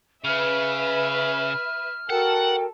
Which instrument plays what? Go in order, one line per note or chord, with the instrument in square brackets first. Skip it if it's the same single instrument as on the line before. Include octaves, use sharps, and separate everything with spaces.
[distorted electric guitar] C#3 [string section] B4 E5 [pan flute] F6
[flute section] F#4 A#4 G5 [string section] A4 [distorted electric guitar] F#5